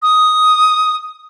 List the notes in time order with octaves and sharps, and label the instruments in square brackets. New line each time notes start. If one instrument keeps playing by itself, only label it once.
[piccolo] D#6